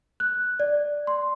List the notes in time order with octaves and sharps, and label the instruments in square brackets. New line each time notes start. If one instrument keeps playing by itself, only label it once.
[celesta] F#6
D5
C6